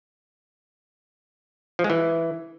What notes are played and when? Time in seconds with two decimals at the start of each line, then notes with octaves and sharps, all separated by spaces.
1.79 F3
1.84 G#3
1.90 E3